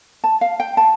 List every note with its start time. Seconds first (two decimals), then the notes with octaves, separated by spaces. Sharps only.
0.24 A5
0.41 F5
0.60 G5
0.77 A5